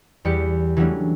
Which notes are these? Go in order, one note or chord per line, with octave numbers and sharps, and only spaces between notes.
E2 G3 G4 D5 C#7
E3 F#3 G3 A3 C#4 D4